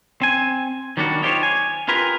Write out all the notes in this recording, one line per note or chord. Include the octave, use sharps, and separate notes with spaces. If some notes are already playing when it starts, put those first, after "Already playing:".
C4 G#5
D#3 F#3 G3 A#3 D4 F#4
D#4 F4 G4 A#4 C5 C#5
G#5
F4 G4 G#4 A#4 B4